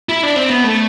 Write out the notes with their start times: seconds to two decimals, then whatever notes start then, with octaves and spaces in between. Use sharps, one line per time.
0.09 E4
0.23 D4
0.36 C4
0.50 B3
0.64 A3